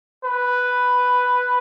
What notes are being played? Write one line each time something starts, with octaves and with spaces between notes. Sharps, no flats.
B4